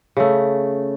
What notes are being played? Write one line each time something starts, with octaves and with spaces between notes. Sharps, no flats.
C#3 A3